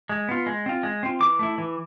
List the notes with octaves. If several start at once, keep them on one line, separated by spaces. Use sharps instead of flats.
G#3
B3 F4
G#3
C4 F4
G#3
C4 F4
E3 D6
A3 E4
E3